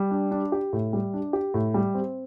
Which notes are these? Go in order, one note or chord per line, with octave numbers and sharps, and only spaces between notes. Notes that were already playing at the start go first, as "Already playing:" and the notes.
Already playing: G3
D4
D4
G4
A2
G3
D4
G4
A2
G3
C4